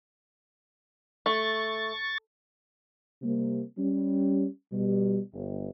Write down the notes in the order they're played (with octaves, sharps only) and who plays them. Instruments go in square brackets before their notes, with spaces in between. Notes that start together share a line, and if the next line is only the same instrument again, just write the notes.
[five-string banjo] A3 [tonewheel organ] C#6 A6
[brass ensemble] C3 G3 A#3
G3 C#4
B2 G3
G1